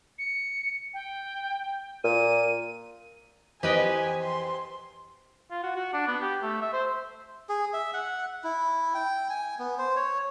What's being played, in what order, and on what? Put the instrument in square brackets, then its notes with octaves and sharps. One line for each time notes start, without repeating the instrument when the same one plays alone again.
[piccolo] C#7
G5
[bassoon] A#2 [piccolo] D#7
[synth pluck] F2 E3 D#5 [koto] G4 B4 G5 [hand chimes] C5 [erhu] G#5
[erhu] C6
[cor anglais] F4
F#4
F#4
D4
B3
G4
A3
E5
C5
[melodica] G#4
E5
F#5
E4
G5
G#5
B3
C5
C#5